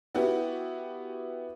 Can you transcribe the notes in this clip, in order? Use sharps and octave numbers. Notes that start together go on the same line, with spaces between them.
B3 E4 F#4 G4